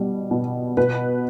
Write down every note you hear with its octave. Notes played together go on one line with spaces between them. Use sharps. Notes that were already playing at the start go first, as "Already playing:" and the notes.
Already playing: B2 G3
B2
B2 B4